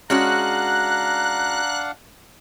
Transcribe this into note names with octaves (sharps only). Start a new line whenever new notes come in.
G#3 C#4 D4 F#4 F5 F#5 A#5 F#6